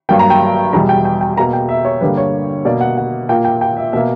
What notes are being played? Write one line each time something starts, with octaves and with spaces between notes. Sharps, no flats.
G2 F#3 A#3 G5
A#5
G5
E2 B2 G3 A#5
G5
G5
G5
B2 A#3 A#5
G5
E5
C#5
G2 D3 G3 A#3 B4
C#5
B2 A#3 D5
F#5
F#5
A#2 A#3 G5
G5
G5
E5
B2 A#3 E5